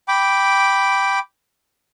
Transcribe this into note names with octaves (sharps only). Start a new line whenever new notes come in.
G5 B5 D6